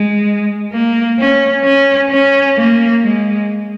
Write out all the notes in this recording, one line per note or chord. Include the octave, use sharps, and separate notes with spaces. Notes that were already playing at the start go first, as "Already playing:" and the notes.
Already playing: G#3
A#3
C#4
C#4
C#4
A#3
G#3